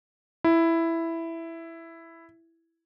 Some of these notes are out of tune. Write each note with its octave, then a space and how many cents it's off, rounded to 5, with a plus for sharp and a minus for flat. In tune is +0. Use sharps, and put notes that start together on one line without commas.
E4 +5